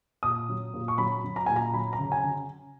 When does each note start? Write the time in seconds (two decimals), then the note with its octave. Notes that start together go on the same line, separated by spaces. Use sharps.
0.23 A#2 D#6
0.49 F#3
0.74 A#2
0.88 C#6
0.98 F#3 B5
1.24 F#3
1.36 A#5
1.46 A#2 G#5
1.56 A#5
1.73 F#3 B5
1.93 A#5
1.99 C#3
2.12 G#5
2.23 C#3